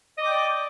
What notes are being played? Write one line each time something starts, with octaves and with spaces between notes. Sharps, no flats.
D5 D#5 G5 D6